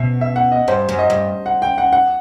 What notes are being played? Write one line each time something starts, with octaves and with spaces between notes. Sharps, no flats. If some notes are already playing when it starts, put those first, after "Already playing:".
Already playing: B2 E5
E5
F#5
D#5
G2 C5
F#2
D#5
G2
F#5
G5
F#5
F#5